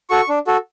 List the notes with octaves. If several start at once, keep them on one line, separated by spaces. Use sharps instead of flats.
F#4 A4 C#6
D4
F#4 A4